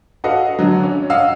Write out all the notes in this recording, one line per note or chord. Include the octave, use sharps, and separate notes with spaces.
F#4 A4 B4 D#5 F5 F#5
D3 F#3
C#4
D#5 F5 F#5 E6